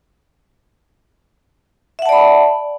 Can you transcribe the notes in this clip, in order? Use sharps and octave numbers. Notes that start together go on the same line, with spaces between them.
D5 E5 F#5 A5 B5